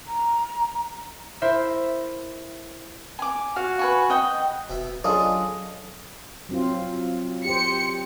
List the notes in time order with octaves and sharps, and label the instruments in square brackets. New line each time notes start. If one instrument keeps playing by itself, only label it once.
[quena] A#5
[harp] E4 A#4 C5 E5
[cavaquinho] G#5 D6
[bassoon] F#4 [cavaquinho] F5
[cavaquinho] B4 G#5 C#6
D#5 F#5 G5
[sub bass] E1 [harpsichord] B2 E5
[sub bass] F#3 [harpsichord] C#4 D4 F4 [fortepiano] G#4 A4 [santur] D#5
[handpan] F#3 C4 F4
[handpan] G4 C5 [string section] C#7